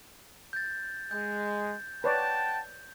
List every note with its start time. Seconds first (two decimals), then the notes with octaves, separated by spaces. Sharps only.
0.53 G6 A6
1.11 G#3 G6
2.04 B4 C#5 D5 F#5 G5 A5